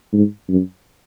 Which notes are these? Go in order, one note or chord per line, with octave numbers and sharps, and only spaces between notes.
G#2
F#2